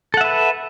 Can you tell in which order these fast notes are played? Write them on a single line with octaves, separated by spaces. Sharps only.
A4 F#5 E5 B4